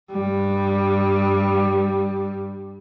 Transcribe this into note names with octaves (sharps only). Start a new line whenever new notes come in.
G2 G3